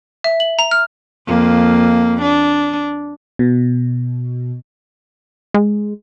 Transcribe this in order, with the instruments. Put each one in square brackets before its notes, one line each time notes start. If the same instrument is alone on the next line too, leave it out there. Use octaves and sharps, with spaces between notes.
[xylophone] E5
F#7
A#5
F6
[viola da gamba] F2 A#3
D4
[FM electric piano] B2
[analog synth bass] G#3